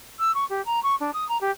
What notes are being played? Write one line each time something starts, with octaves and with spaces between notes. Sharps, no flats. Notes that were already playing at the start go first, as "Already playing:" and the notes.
E6
C#6
G4
A#5
C#6
D4
D#6
A#5
G4